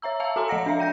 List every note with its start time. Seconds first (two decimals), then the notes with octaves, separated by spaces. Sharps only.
0.02 C#5 E5 A#5 E6
0.20 E5 F5 A5 A#5 E6
0.36 F#4 A4 G#5 A#5 C6
0.48 F3 D#5 F#5 A#6 C#7
0.66 D4 E5 F5
0.79 D5 G5 G6 A#6